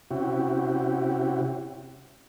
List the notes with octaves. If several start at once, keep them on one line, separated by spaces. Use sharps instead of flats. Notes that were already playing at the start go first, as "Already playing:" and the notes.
C3 C#4 E4 F#4 G4